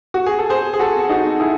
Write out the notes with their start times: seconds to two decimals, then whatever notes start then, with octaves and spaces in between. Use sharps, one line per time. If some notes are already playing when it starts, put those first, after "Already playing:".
0.14 F#4
0.26 G#4
0.39 A4
0.49 G#4 C5
0.73 G#4
0.79 F#4 A4
1.09 D#4 F#4
1.40 E4 G#4